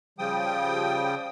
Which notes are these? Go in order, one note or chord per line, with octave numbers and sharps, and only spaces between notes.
C#3 F3 G3 G5 D#6